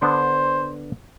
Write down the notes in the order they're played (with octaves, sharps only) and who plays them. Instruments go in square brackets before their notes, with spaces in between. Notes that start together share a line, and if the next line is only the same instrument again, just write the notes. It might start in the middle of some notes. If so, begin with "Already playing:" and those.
[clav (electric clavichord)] D3 B3 D4 [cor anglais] C5